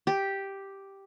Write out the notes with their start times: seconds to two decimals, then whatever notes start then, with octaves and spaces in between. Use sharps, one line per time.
0.07 G4